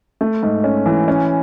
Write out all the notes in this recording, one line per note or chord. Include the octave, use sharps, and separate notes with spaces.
A3
G#2
C#4
E3
C#4